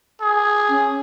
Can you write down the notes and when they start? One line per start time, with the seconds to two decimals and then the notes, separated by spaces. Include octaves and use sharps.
0.21 G#4
0.70 C#4